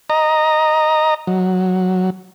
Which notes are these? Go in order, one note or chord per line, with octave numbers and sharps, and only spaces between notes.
D#5 A#5
F#3